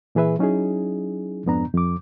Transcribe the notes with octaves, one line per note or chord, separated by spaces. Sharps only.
A#2 E3 G#4 B4 E5
F#3 C#4 D#4 E4 G#4
F2 G#2 B3 D4 A#5
F2 D6